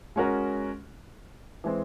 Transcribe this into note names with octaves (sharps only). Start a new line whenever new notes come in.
G#3 C#4 F#4 A#4
E3 G#3 C4